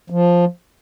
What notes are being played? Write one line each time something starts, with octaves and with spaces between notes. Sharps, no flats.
F3